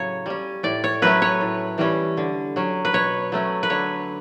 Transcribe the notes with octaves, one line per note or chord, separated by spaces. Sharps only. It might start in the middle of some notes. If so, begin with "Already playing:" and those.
Already playing: A2 C#3 F#3 C#5
G3 C#4
A2 D5
C#5
F#3 A3 C#4 B4
C#5
A2
E3 G3 C#4
D3
F#3 C#4
B4
B2 C#5
F#3 A3 C#4
B4
D3 C#5